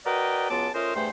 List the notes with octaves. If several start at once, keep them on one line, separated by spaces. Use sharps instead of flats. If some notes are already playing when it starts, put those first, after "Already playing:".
F#4 A#4 B4 D5 D#5 G5
C#2 F#3 B3 F4 A5 D6
A3 C#4 F4 A#4 C5 D#5
E2 G2 A3 C5 G5 C6